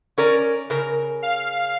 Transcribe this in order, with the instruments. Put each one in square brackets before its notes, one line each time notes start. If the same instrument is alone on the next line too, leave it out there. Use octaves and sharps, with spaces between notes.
[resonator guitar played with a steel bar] C#4 A#4 D5
C#3 A#4
[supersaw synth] F5